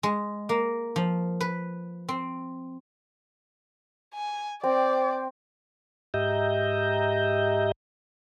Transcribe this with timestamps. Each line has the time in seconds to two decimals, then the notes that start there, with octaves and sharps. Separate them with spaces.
0.03 G#3
0.49 A#3
0.96 F3
1.41 B4
2.09 C4
4.14 G#5
4.64 C4 C5 D5 G5
6.14 G#2 G4 D#5 E5 A#5 G6